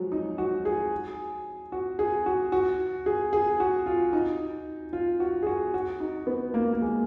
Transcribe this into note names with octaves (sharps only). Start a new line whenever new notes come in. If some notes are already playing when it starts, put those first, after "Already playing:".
Already playing: F3 F#3 G#3
D#4
F#4
G#4
F#4
G#4
F#4
F#4
G#4
G#4
F#4
F4
D#4
F4
F#4
G#4
F#4
F#4
D#4
B3
A#3
A#3
G#3